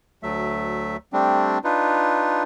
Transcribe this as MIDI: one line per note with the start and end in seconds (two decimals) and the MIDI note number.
0.23 0.97 38
0.23 0.97 54
0.23 0.97 57
0.23 0.97 76
1.13 1.58 55
1.13 1.58 57
1.13 1.58 60
1.13 1.58 62
1.64 2.43 62
1.64 2.43 63
1.64 2.43 65
1.64 2.43 71